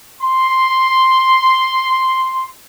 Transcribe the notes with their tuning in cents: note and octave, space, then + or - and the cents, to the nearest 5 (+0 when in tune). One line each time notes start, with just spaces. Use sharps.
C6 +0